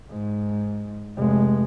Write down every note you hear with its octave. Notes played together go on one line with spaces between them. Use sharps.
G#2
F1 G#3